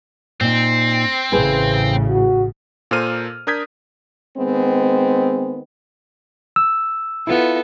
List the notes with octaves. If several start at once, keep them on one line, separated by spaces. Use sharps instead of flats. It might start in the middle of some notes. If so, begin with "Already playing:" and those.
A#2 C4 D#4
A1 A2 C#3 E4 G#4 B4
F#4
A#2 A#3 A4 C5 F6 D#7
D4 A#4 D#6 G6 G#6 B6
D#3 G#3 B3 C4
E6
B3 E4 F4 A4